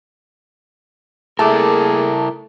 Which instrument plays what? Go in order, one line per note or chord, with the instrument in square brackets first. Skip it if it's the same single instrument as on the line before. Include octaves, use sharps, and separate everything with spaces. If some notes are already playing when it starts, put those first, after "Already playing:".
[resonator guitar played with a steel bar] A3 [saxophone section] A#3 G#4 [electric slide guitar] E4 A#4 [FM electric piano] A5 D6